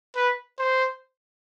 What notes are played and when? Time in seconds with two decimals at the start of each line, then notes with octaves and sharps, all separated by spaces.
0.16 B4
0.59 C5